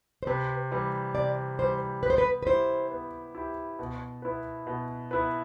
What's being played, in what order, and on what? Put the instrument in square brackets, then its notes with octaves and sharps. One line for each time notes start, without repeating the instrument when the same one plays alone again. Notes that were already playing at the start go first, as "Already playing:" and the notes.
[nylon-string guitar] C5
[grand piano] C3 [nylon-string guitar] B4
[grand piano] E3 G3
[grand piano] C3 [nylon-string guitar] D5
[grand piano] E3 G3 [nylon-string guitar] C5
[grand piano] B3 [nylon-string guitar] B4
[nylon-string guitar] C5
B4
B4
[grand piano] E4 G4 [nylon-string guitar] C5
[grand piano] B3
E4 G4
B2
B3 E4 B4
B2
B3 E4 B4